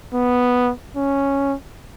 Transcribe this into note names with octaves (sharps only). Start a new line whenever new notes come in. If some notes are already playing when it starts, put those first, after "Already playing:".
B3
C#4